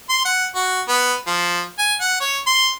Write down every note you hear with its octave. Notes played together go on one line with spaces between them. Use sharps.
C6
F#5
F#4
B3
F3
G#5
F#5
C#5
C6